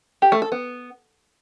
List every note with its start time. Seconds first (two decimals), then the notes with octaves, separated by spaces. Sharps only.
0.22 G4
0.32 A3
0.42 A4
0.52 B3